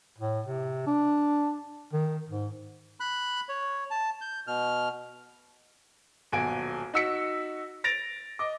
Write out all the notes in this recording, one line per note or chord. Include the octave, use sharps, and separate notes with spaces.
A2
C3
D4
D#3
G#2
B5 F#6
C#5
A5
G6
B2 F6
D#1 B1 F#4 G#5 D7
D#4 F#4 E6 B6 C#7
A6 A#6 D7 F7
D#5 D6